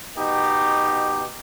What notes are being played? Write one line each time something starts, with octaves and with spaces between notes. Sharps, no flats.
B2 D#4 G4